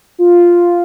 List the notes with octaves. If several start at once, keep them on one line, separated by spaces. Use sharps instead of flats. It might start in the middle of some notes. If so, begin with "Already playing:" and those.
F4